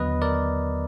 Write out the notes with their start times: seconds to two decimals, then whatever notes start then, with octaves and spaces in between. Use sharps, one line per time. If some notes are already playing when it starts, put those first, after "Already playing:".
Already playing: D#2 D3 F#3 B3 B4 D#5
0.22 A#4 D5